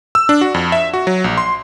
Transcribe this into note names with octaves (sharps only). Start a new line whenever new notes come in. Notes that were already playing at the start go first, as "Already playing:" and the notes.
E6
D4
F#4
F2
E5
F#4
F#3
A#1
C6